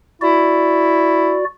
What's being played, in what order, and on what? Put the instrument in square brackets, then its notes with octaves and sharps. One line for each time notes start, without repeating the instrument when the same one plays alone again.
[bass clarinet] E4 [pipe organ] F#4 D5